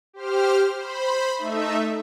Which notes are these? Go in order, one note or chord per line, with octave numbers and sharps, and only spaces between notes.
G4 C5 F6
C5 B5
A3 D#4 E5